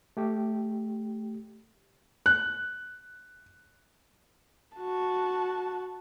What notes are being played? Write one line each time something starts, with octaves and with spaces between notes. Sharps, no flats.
A3 G4
F#6
F#4 A5